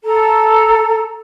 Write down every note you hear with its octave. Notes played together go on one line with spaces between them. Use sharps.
A4 A#5